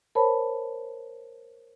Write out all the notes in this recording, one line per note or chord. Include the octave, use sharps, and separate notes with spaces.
A#4 C5 C#5 A5 B5